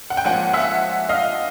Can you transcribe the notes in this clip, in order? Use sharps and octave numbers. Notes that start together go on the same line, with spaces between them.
F#5
G5
G#2 F3 A#3 C#4 F4 F#5 G#5
E5 F#5
D#5 F5